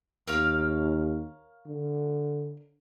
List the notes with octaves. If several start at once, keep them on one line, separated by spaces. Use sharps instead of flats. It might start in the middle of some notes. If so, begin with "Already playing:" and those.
D#2 A#4 C#5 F5
D3